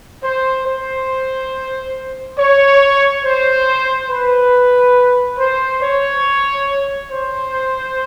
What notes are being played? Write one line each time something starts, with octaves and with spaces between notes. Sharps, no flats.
C5
C5
C#5
C5
B4
C5
C#5
C5